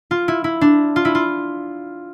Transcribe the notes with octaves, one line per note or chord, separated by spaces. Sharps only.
F4
E4
E4
D4
F4
E4
F4